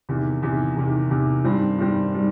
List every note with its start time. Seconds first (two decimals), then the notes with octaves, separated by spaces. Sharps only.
0.09 E2 C3 D#3
0.43 E2 C3 D#3
0.76 E2 C3 D#3
1.10 E2 C3 D#3
1.44 G2 D#3 G3 C4
1.78 G2 D#3 G3 C4
2.14 D#3 G3